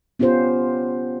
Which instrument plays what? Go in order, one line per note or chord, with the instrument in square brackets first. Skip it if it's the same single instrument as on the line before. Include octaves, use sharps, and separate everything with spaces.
[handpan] B3 C#4 F4 G4 C5